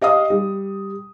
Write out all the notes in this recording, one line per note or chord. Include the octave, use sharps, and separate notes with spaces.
G4 D#5 F5 D#6
G3